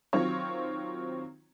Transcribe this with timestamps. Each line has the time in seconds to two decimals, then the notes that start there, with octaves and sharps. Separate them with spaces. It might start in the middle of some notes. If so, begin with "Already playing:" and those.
0.13 D#3 F#3 C4 F4 C#5 C#6